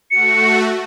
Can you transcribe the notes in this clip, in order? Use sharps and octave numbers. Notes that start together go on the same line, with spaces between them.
A3 F#4 C#7